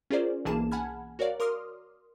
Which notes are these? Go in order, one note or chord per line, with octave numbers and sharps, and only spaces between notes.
C#4 F4 G#4 A#4 C5 D5
B1 E3 A#3 G#4 A5 E7
F#5 G#5 A5 B5 F6 G#6
F#4 A#4 C#5 D5 F5
A#4 C6 D6 D#6 F6